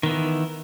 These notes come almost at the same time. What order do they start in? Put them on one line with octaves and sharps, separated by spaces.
D#3 B3 E3